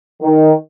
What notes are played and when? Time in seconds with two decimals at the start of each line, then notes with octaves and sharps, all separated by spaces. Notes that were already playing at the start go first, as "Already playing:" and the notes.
0.22 D#3